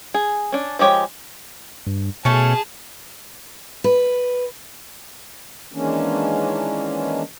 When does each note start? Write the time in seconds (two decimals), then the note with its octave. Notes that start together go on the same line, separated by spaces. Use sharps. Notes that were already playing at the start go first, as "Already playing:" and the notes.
0.14 G#4
0.52 C#4 D4
0.79 F3 G#3 G4 C#5 G5
1.87 G2
2.25 B2 A3 C#4 G#4 A5
3.84 B4
5.72 D#3 E3 G#3 A#3 C#4 D4